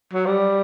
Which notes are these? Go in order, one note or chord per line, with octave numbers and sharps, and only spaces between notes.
F#3
G3